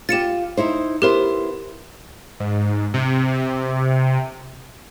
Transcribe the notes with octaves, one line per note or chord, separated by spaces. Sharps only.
F4 G4 A6 C#7 E7
D#4 E4 C5
B3 E4 G4 A#4 C5
G#2
C3